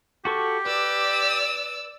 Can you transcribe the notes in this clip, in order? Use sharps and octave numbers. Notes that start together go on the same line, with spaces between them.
F#4 G4 A4 C#6
B4 D5 E6